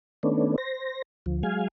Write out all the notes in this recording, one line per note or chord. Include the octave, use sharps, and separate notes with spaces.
D#3 A3 B3 C#4 D4
C5 A#6
D2 F3
F#3 G#3 F5 G#5